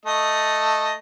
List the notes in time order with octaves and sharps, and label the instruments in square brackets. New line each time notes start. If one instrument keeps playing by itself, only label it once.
[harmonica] A3 D#5